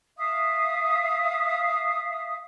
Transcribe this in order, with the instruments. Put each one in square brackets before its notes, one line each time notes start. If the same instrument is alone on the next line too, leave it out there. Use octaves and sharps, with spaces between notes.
[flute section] E5 F5 D#6